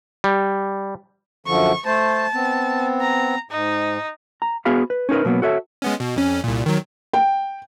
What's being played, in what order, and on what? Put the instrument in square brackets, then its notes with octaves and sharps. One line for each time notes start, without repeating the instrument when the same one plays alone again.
[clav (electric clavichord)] G3
[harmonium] F#2 D3 F3 [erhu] C#6
[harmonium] A3 C5 [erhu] A5
[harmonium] B3 C4
[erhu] A#5
[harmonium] G#2 [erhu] D#4
[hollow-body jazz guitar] A#5
B3 F#4 G#4 F5 B5
B4
C#4 D#4 A#4 B4
B2 F#3 A#3 B3
F#4 A4 C#5 E5
[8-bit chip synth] G#3 B3 C#4
B2
F2 C#4
C2 A#2
D#3 F#3
[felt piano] G5